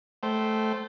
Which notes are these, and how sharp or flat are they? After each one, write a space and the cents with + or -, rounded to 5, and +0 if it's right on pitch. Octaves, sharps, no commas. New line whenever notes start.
A3 -10 C5 +0 G5 -30